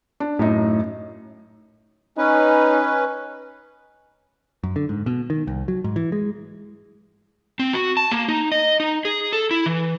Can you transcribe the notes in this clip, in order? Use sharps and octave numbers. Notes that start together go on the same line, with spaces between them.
D4
F#2 A2 D#4
C#4 D#4 B4
F#2
D3
G#2
B2
D#3
C2
F#3
G#2
E3
G#3
C4
F#4
A5
A#3
D#4
D#5
D#4
G#4
A4
E4
E3